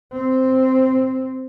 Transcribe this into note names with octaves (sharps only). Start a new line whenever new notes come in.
C4